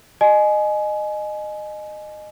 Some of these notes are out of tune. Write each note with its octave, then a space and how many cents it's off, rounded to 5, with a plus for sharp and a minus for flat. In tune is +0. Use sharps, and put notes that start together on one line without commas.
D#5 -25 G#5 +25